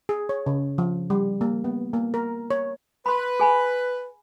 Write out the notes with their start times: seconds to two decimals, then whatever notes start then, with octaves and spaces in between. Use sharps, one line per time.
0.09 G#4
0.29 C#5
0.46 C#3
0.78 F3
1.10 G3
1.41 A#3
1.64 B3
1.93 A#3
2.14 A#4
2.51 C#5
3.06 B4 B5 C6
3.40 G#4 G#5 B5